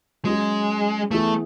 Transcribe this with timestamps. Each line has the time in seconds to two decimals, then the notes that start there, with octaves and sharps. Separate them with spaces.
0.25 F#3 G#3 C#4 G#4
1.11 E3 A3 B3 E4 G#4